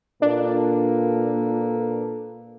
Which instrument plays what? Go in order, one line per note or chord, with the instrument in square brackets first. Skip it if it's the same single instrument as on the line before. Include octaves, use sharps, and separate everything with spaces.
[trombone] A#2 [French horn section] A#3 A4 B4 [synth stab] D4